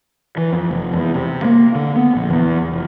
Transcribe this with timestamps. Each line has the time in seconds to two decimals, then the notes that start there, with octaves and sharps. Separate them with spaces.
0.37 E3
0.53 F2
0.71 F1
0.93 E2
1.14 C3
1.45 A#3
1.75 D3
1.96 B3
2.15 A#1
2.30 E2
2.71 F1